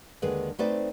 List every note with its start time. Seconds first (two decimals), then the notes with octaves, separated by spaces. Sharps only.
0.22 D#2 D3 G#3 G#4 B4
0.59 A3 C4 D#4 B4 C5 D5